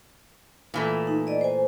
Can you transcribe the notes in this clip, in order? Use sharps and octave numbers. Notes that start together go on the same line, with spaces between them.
A#2 E3 A3
D#4
D5 D#5
C5 G#5